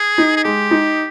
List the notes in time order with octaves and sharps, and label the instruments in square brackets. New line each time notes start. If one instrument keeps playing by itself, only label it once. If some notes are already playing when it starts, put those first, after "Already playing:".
Already playing: [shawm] G#4
[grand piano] D#4
[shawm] G#4
[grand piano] G#3 [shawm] G4
[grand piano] D#4